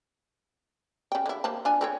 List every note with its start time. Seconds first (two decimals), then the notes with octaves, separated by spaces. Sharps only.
1.12 C#3 G5
1.26 D3 E4
1.44 A#3 C5 A5
1.65 D4 F4 G#5
1.81 C4 A4 C#5